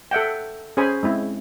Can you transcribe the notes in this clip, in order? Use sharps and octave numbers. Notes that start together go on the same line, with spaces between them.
A4 E5 F#5 G5
C#4 G#4 C5 G#5 B5
G#3 C4 E4